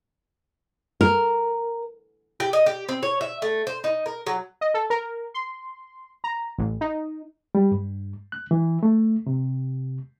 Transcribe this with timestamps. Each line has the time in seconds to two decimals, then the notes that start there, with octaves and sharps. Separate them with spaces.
1.01 A#4
2.40 G4
2.53 D#5
2.66 G4
2.89 C4
3.03 C#5
3.21 E5
3.42 A3
3.67 C5
3.84 D#4
4.06 A#4
4.27 F#3
4.61 D#5
4.74 A4
4.90 A#4
5.34 C6
6.24 A#5
6.58 A1
6.81 D#4
7.55 G3
7.71 G2
8.32 F#6
8.51 E3
8.83 A3
9.27 C3